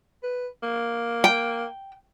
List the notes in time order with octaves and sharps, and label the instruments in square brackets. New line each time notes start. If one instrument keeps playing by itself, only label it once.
[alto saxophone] B4
A#3
[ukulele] G5